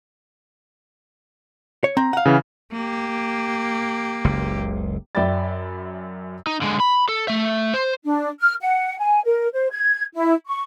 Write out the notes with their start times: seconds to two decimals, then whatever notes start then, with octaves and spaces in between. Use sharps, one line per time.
1.84 C#5
1.97 C4 A#5
2.13 F5 F#5
2.26 C#3 E3
2.73 A#3 G4
4.24 F#1 C#2
5.15 F#2 D5 E5 G5 B5 A6
6.47 D#4
6.61 D3 G#3
6.80 B5
7.09 A4
7.28 A3 E5
7.74 C5
8.05 D4
8.40 F6
8.61 F#5
8.99 G#5
9.25 A#4
9.54 C5
9.71 G#6
10.13 E4
10.47 C#6